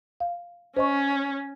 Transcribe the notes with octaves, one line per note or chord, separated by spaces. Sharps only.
F5
C#4 C5 D#5 C#6